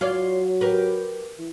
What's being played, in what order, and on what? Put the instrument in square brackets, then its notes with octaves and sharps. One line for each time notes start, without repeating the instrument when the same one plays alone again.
[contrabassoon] F#3 [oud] F4 C#5 D5
[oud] G4 A#4 B4
[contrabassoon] E3